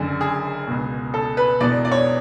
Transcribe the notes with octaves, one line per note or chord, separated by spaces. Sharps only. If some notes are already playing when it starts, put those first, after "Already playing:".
Already playing: F#1 F#2 D3 G#4
G#4
C#2 B2
A4
B4
E1 E2 B2 D5
D5
C#5